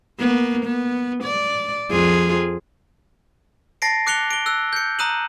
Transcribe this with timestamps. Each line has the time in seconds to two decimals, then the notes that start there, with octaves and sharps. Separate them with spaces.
0.20 A#3 B3
0.65 B3
1.24 D5
1.91 F2 F4 G#4
3.82 A5 A6 A#6 C7 D7
4.07 D6 F#6 C#7 F7 G7
4.31 D7 G7
4.46 E6 F#6
4.73 G6 C#7
4.99 A#5 D#6 F#6 D#7 E7 F#7